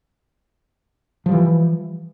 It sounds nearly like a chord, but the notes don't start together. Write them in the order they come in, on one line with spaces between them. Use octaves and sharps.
F3 G3 E3